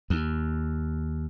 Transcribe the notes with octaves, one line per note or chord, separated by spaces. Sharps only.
D#2